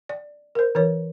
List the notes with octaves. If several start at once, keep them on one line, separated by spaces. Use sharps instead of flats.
D5
A#4 C5
E3 A#4 C#5